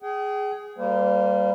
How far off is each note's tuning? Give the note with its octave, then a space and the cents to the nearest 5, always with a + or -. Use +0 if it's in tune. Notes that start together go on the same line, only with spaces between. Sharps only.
G#4 +0 G5 -45
G3 +0 A#3 -10 C5 -40